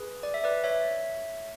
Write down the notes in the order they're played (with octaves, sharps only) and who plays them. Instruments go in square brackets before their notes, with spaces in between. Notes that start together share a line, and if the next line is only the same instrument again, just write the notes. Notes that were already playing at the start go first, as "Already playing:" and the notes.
Already playing: [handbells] G#4 B4
D5
E5
B4 D5
C#5 E5